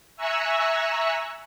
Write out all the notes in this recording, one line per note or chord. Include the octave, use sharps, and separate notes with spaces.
E5 G#5 A#5 C#6 E6 F#6